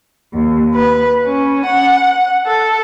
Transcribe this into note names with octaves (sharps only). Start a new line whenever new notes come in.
D#2
B4
C#4
F#5
A4